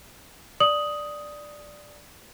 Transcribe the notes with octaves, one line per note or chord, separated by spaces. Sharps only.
D5 D#6 F#7